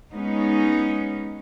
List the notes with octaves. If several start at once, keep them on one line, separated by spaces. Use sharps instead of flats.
G#3 B3 C#4 D#4